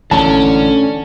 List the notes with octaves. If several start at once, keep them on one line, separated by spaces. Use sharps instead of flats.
A1 A#2 D3 C#4 A5